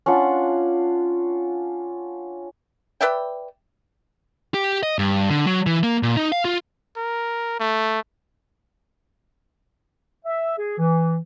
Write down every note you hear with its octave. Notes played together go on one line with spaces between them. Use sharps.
C#4 D4 F4 F#5
B4 D5 E5 G5
G4
D#5
G2
D3
F#3
E3
A#3
A#2
D#4
F5
F4
A#4
A3
E5
G#4
E3